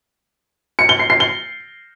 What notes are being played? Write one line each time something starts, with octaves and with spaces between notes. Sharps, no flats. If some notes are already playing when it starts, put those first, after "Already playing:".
C#7
G7
C7
C7
G7